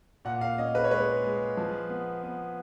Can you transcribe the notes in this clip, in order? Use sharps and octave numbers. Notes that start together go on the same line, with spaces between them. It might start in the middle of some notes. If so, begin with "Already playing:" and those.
A#2 F#5
F5
C#4 D#5
B4
C#5
G#3 B4
G#3
F3
B3
B3